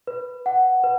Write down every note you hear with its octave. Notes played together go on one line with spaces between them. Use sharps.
B4
F#5
B4